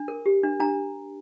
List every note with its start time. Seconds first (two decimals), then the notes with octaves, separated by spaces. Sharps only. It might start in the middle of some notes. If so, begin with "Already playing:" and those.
Already playing: D4
0.08 A#4
0.26 G4
0.43 D4
0.60 D4 A#5